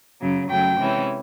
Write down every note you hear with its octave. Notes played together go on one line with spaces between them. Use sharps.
F#2 C#3 F#3
F#2 C#3 F#3 A3 G5
C3 E3 G#3 C#4 E4